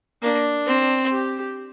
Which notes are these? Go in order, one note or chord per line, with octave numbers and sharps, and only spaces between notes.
A#3 D4
C4
G4